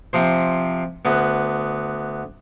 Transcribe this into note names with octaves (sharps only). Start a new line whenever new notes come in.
C3 F3 C5
D2 B3